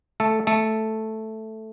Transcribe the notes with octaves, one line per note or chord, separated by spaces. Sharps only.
A3 A4
A3 A4